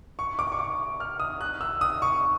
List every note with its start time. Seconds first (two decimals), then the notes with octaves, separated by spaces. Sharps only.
0.19 C#6
0.39 D6
0.52 C#6
0.59 D6
1.00 F6
1.20 D#6
1.41 F#6
1.61 E6
1.81 D#6
2.02 C#6